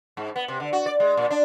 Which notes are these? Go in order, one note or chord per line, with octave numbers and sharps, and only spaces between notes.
G#2
B3
C3
D3
F#4
D5
G#3
A#2
D4